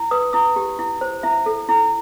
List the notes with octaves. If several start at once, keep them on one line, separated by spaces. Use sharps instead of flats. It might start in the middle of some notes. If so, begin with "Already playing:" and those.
Already playing: E4
B4 D#6
E4 D#6
G4
E4
C5
E4 E5
A4
E4